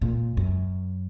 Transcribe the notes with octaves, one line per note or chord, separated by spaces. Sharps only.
A#2
F#2